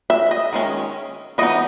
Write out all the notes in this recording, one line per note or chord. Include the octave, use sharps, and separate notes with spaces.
E5
D#5
D#3 G#3 C#4
E3 B3 D#4 D#5